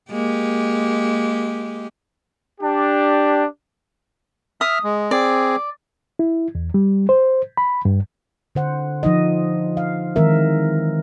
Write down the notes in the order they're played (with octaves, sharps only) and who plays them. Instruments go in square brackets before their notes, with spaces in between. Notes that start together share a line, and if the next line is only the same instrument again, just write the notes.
[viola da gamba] G#3 A#3 G4
[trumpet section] D4 G4
[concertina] E5 F6 [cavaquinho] D#6
[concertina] G#3
[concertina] C4 G#4 [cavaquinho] D5
[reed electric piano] E4
E2
G3
C5
B5
G2
[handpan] D3 C5 F#5
F3 D#4 D#5
F5
D#3 E3 G#3 C4 A#4 E5